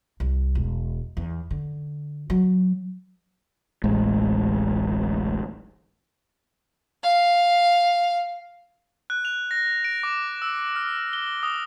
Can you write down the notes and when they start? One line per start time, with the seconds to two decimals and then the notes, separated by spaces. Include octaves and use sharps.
0.20 C2
0.55 E1
1.17 E2
1.51 D3
2.30 F#3
3.84 D1 A1 G#3
7.03 F5
9.10 F#6
9.25 F7
9.51 A#6
9.85 D7
10.03 D6
10.42 E6
10.76 F6
11.13 G7
11.43 D#6